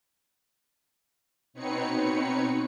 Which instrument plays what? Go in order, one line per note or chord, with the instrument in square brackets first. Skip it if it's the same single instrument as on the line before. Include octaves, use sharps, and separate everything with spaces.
[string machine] B2 C4 D#4 B4 C#5 C#7